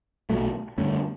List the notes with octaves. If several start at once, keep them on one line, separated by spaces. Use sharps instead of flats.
B1 B2 F#3 A3
G2 D3 A3 C#4